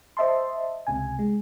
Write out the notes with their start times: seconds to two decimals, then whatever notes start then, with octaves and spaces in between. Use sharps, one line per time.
0.17 C5 D#5 E5 A5 C6
0.87 C#2 C3 G#5
1.19 G#3